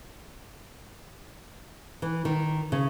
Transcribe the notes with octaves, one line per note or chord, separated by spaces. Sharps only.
E3
D#3
C#3